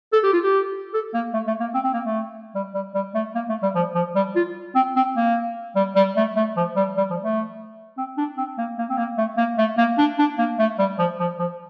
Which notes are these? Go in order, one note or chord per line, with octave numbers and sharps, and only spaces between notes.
A4
G4
F4
G4
A4
A#3
A3
A3
A#3
C4
C4
A#3
A3
G3
G3
G3
A3
A#3
A3
G3
F3
F3
G3
F4
C4
C4
A#3
G3
G3
A3
A3
F3
G3
G3
F3
A3
C4
D4
C4
A#3
A#3
C4
A#3
A3
A#3
A3
A#3
D4
D4
A#3
A3
G3
F3
F3
F3